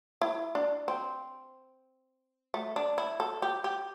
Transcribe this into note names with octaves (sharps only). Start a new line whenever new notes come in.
E4
D4
C4
A3
D4
E4
A4
G4
G4